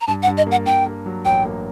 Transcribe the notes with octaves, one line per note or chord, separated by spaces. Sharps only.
A#5
G2 A5
F#5
G2
D#5
A#3 F#5
G2 G5
A#3
F#3
A1 G5
A#3